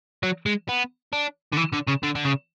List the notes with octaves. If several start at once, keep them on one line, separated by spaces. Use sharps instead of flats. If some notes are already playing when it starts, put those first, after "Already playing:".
F#3
G#3
B3
D4
D3
E3
D3
C#3
D3
D3
C#3